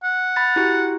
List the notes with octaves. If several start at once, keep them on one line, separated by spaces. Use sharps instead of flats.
F#5
B5 A6
E4 F#4 G4